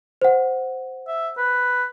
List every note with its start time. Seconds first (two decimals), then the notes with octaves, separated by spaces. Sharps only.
0.22 C5 F#5
1.07 E5
1.37 B4